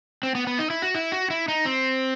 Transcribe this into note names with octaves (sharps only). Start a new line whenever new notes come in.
C4
B3
B3
D#4
E4
F#4
E4
F#4
E4
D#4
C4